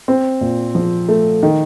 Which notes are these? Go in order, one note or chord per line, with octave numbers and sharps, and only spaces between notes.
C4
A#2
F3
A3
D#3